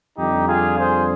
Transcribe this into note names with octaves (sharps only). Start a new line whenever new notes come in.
F2 D3 G3 D#4 G4
F4 G#4
G#4 C5